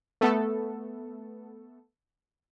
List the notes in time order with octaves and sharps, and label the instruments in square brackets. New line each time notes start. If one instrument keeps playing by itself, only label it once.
[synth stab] A3 B3 A4